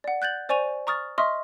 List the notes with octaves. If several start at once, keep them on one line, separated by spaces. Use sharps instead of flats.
D5 F#5
F#6 G6 A6 F#7
C5 D5 G#5 C#6 D#7 F7
A#5 C#6 D#6 F6 A6
D#5 E5 C6 C#6 D#6 F6